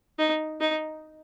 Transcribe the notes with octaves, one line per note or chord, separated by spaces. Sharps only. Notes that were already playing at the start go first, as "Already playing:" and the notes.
D#4
D#4